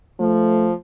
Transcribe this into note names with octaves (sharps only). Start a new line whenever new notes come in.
F3 A3